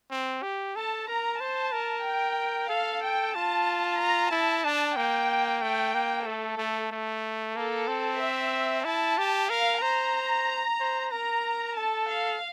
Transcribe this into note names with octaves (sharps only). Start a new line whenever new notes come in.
C4
G4
A4 A5
A#4 A#5
C5 A5
A#4
G5
A4 F5
G5
F4 A5
A#5
E4 A5
D4
A#3 G5
A3 G5
A#3
A3 A4
A3
A3
A#3 A4
C4
E5
E4 A5
G4
A#4 F5
C5 A#5
C5
A#4 A#5
A4 A5
F5